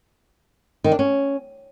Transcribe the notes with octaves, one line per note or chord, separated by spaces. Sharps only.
D#3
D4
C#4